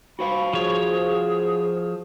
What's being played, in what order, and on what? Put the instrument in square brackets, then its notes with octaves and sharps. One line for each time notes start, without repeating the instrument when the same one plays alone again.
[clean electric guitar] F#4 C5 F5 [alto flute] B5
[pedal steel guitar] F3 C#5 [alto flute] G#4